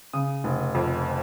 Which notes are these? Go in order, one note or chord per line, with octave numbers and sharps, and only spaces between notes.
C#3 D#6
F1
F2